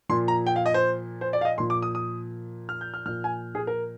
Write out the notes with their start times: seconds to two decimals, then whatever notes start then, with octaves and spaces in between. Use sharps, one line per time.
0.09 A#2 F3 C6
0.28 A#5
0.47 G5
0.56 F5
0.66 D#5
0.74 C5
1.21 C5
1.33 D5
1.41 F5
1.45 D#5
1.58 A#2 F3 C6
1.70 D6
1.82 D#6
1.95 D#6
2.69 F6
2.81 G6
2.94 F6
3.06 A#2 F3 F6
3.24 G#5
3.55 G#4
3.67 A#4